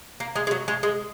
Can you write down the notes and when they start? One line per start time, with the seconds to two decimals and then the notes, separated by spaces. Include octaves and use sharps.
0.20 A#3
0.35 G#3
0.47 G#3
0.51 F#3
0.68 G#3
0.83 G#3